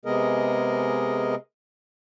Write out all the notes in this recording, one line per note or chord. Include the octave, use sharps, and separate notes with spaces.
C3 G#3 B3 G#4 A#4 D#5